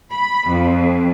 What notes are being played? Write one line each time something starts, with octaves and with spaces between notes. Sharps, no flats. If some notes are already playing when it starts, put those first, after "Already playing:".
B5
F2